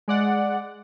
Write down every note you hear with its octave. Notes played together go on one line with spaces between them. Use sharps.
G#3 D5 F#5